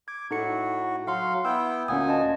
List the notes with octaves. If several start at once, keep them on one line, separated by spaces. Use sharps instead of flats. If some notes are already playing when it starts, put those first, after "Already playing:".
D6 G#6
A2 D#4 F#4 A4 C#7
F#3 F5 F#5 C6
B3 E4 F#5 G5 E6
D2 A#2 C#4 F#5 G#5 D#6
D#5 A5